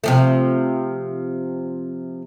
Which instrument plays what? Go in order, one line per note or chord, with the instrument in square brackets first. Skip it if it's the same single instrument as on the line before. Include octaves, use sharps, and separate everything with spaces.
[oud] C3 F3 A3